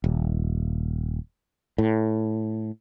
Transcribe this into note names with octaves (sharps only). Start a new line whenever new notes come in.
D#1
A2